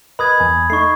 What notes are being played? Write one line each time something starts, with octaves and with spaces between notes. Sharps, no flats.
A#4 B4 D#5 B5 D#6 G#6
E2 G#5
A3 D#4 C#6 C7